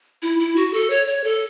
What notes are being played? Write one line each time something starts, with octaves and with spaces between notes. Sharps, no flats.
E4
E4
F#4
A4
C#5
C#5
A4